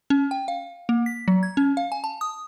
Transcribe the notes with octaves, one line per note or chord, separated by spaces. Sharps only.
C#4
G5
F5
A#3
B6
F#3
G#6
C#4
F5
G#5
A5
D#6